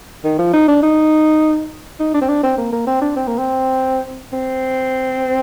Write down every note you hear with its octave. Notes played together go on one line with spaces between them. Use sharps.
D#3
F3
D#4
D4
D#4
D#4
D4
C4
D4
C4
A#3
A#3
C4
D4
C4
A#3
C4
C4